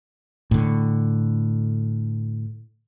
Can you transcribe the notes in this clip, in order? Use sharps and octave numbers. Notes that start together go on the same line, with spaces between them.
A2 D3